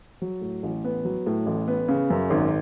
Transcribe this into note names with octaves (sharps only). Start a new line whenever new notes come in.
F#3
A2
A1
B3
F#3
A2
A1
B3
C#3
F#2
G#1